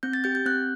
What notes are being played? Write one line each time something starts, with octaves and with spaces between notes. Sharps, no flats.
C4 G6
A6
G4 G6
G6
C4 F#6